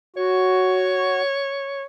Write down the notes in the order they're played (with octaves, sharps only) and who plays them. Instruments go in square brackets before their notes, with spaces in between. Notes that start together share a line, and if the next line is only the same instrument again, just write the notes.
[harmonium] F#4 [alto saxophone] C#5